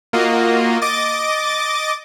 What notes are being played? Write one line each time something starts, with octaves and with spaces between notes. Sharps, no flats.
A#3 F4 F#4 D#5
D#5 D6 A6